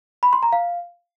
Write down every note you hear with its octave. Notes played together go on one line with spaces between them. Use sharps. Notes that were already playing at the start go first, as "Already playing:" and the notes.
B5
C6
A#5
F5